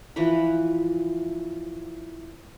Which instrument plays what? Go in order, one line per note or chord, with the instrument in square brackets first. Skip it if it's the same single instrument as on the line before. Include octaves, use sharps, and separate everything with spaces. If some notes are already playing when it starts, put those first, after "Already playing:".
[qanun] E3 F3 B4 B5